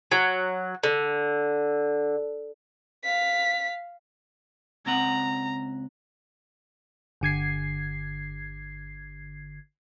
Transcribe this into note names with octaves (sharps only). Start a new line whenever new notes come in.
F#3
D3
F5 B6
C#2 C4 F#5 A#5
G1 D3 G#6 C7